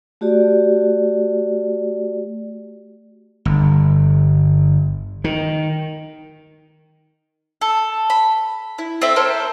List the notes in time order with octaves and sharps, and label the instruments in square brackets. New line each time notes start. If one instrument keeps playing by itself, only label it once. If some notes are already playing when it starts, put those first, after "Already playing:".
[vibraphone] A3 F#4 G4 D5
[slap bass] G1
D#3
[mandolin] A4
B5
E4
C4 A4 E5
A4 A#4 C5 C#5